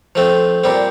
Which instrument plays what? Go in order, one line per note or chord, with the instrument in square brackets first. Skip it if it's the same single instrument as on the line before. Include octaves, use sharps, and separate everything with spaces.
[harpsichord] F3 A3 C4
A#2 G3 C4